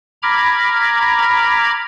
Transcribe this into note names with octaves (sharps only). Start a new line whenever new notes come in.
A#5 B5 D6 F6 G#6